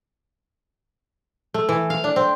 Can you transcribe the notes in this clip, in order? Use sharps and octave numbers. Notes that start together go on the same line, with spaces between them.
A3
E3
F5
D4
C4